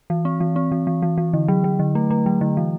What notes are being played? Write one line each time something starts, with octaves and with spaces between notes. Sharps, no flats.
E3
C4
E3
C4
E3
E3
E3
E3
D3
F#3
F#3
D3
A3
A3
F#3
D3
E3